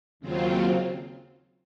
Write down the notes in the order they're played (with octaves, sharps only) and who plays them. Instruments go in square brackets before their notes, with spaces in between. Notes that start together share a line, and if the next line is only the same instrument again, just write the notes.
[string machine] D#2 C#3 F#3 C4 F4